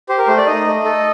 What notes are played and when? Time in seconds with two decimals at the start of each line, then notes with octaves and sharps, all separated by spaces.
0.09 G4 C5
0.18 A#4
0.27 A3 C5
0.37 D5
0.46 D#4 D#5
0.67 A3
0.85 A4